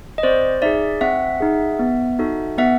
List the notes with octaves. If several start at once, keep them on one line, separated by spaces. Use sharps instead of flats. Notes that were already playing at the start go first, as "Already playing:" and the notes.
D#5
C4 C5 D5
D#4 G#4 D5 E5
C4 E5 F#5
D#4 G#4
B3
D#4 F#4 A4
B3 E5 F#5